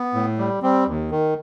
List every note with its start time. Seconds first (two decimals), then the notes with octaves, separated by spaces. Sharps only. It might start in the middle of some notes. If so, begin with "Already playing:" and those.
Already playing: B3
0.14 A2
0.38 G3
0.62 G3 C4
0.87 D#2
1.11 D#3